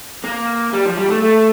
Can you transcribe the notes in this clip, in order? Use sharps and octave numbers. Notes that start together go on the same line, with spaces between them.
A#3
G3
F3
G3
A3
A3